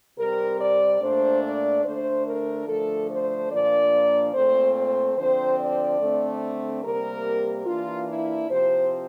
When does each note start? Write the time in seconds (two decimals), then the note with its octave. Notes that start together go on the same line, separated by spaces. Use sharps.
0.18 C3 G3 C4 A#4
0.60 D5
1.01 A#2 A3 D4 C5
1.43 D5
1.85 D3 A3 D4 C5
2.26 A#4
2.68 D3 F3 A3 A4
3.09 C5
3.51 A#2 F3 A#3 D4 D5
4.34 A#2 A3 C4 C5
4.75 C5
5.17 D3 F3 C4 C5
5.59 D5
6.00 D3 A3 C4
6.83 C3 G3 A#3 A#4
7.66 E3 A#3 D4 F4
8.08 E4
8.50 C3 F3 C4 C5